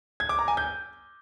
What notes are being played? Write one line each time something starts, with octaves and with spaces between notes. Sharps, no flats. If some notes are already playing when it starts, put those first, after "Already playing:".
G#6
D6
A#5
G#5
G6